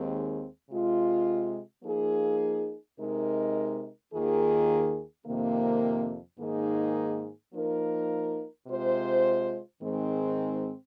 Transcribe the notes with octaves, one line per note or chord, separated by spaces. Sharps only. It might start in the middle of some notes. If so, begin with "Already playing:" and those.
Already playing: D#2 D#3 G#3 C4 G#4
C3 G#3 F4
F3 A#3 D#4 G#4
C3 G#3 D#4 A#4
D#2 D#3 A#3 F4 G#4
F2 C3 D#3 A#3
G#2 D#3 A#3 D#4 G#4
F3 A#3 D#4 A#4
C3 G#3 F4 C5
G#2 D#3 G#3 C4